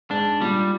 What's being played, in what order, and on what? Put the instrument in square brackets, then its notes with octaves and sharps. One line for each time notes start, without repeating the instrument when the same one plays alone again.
[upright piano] G#2 [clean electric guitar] D4
[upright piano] A#2 [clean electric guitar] G3